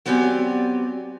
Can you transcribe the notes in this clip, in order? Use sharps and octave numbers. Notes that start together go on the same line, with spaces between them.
F#3 B3 C4 G4 D5 G#5